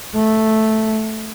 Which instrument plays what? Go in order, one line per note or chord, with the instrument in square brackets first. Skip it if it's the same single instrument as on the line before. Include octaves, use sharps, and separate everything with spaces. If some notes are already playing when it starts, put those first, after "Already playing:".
[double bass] A3